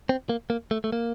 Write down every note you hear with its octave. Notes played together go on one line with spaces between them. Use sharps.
C4
A#3
A#3
A3
A3
A#3